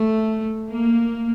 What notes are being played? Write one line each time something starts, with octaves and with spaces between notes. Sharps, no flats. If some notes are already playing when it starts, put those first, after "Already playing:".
Already playing: A3
A#3